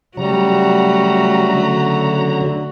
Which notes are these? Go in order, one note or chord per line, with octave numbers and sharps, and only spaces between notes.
C#3 F#3 G3 A3 F#4 A#5
D3